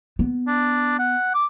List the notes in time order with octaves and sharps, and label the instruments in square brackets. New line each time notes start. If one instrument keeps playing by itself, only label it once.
[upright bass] B3
[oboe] D4
F#5
D6